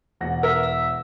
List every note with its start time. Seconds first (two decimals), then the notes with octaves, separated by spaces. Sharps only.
0.20 E1 F#5 A#6
0.43 A#4 E5 E6
0.63 E6